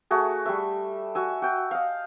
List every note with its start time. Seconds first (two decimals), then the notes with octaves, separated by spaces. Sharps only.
0.11 A3 F#4 G#4
0.46 G3 E5
1.15 F#4 G#5 E6
1.42 F#4 G5
1.71 D#5 F5